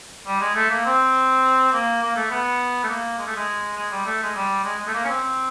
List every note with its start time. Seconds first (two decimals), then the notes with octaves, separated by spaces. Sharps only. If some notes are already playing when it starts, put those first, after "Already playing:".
0.27 G3
0.41 G#3
0.55 A3
0.70 A#3
0.85 C4
1.73 A#3
2.02 A#3
2.16 A3
2.31 B3
2.83 A3
2.89 A#3
3.19 G#3
3.27 A3
3.36 G#3
3.77 G#3
3.91 G3
4.06 A3
4.23 G#3
4.36 G3
4.64 G#3
4.79 G#3
4.87 A3
4.93 A#3
5.04 C#4
5.08 C4